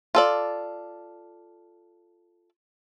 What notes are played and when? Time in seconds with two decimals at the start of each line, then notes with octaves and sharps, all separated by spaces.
0.15 F4 A4 D5